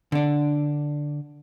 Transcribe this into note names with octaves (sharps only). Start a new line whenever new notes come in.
D3 D4